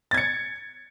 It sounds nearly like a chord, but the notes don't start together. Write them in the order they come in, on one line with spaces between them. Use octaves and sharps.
A6 G#6 C#7